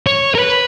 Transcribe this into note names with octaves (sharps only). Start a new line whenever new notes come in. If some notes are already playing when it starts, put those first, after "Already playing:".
C#5
A#4
B4